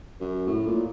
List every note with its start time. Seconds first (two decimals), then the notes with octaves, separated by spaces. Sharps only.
0.20 F#2
0.47 A2
0.66 A#2